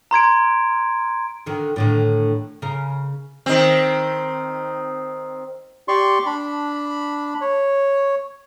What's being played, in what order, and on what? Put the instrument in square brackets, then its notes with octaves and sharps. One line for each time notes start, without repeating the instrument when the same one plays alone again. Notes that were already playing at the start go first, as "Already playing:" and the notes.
[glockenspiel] A#5 C6 G#6 D7
[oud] D3 D#3
A2 D3 D#3
C#3 A#4
[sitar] D#3 C4
[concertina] G4 D5 C6 C#6
D4 B5
C#5